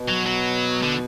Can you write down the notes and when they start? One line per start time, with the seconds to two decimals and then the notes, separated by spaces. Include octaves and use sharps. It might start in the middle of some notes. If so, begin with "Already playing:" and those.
Already playing: B2
0.08 F#3
0.26 F#3
0.83 D3